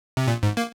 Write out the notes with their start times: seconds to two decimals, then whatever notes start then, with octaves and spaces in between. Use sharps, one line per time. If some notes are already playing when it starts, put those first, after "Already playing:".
0.17 C3
0.28 A#2
0.43 G#2
0.57 A#3